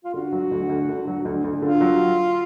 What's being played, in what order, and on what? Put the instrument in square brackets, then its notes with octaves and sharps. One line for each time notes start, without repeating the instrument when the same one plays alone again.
[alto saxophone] F4
[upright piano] D3 [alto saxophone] F#4
[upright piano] F#3
D2
D2
D3
F#3
D2
D2
[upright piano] D3 [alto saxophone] F4
[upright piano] F#3